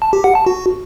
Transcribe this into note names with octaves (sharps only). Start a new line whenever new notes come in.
A5
G4
F#5
A5
F#4